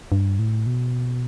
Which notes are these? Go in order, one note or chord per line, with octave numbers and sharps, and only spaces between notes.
G2
A2
B2